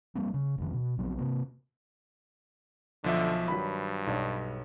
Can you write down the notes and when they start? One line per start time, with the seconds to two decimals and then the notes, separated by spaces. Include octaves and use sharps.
0.15 G3 A#3 C4
0.34 C#3
0.58 F1 G#2 D#3
0.73 B2
0.97 A#1 F#3 B3 C4
1.18 C3 A#3
3.04 B1 D3 F3 E5
3.48 G2 D#3 F#3 B5
4.07 B1 D4 C#5